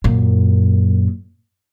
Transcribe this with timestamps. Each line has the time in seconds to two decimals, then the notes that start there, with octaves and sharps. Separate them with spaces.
0.04 F#2 A#2